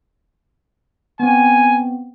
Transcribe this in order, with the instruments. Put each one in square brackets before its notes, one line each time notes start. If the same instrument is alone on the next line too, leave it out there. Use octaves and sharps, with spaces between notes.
[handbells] B3 C4 [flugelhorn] G#5